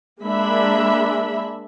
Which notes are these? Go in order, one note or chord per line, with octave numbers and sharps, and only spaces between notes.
G#3 A#3 D4 E5 B5